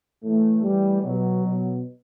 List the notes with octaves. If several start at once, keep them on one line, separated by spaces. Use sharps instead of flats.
A2 E3 A3
A2 E3 G3
B2 F#3
B2